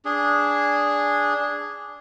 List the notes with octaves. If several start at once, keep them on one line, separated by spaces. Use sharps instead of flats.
D4 G#4